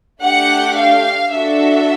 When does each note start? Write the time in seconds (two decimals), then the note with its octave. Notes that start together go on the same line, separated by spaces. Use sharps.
0.22 A3 D4 G4 F#5
0.77 F5
1.32 D4 F#4 A4 E5